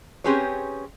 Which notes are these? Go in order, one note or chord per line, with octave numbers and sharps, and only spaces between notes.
C4 C#4 G4 G#4 B4 C#5